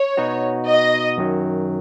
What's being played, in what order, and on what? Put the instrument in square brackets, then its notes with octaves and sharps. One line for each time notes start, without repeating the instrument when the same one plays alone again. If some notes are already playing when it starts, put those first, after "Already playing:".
Already playing: [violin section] C#5
[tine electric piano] B2 B3 D#4 F#4
[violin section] D#5
[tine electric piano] F#2 D#3 F#3